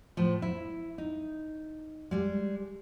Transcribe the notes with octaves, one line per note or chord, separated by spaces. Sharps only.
A2 F3
E4
D#4
G3 G#3